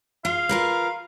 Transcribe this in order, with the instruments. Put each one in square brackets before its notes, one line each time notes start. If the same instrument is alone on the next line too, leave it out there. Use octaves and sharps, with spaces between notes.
[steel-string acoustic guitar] F4 [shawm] F5
[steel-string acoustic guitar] F4 A#4 B4